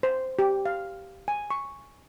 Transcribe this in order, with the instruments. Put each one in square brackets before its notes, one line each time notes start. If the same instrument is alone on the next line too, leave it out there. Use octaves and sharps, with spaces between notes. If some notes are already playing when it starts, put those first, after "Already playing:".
[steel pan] C5
G4
F5
G#5
C#6